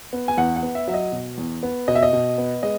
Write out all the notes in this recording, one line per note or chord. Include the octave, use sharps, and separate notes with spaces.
B3
G#5
E2 F#5
F#5
B3
E5
F#3 E5
D#5
B2
E2
B3
B2 D#5
E5
D#5
B2
B3
G#3 D#5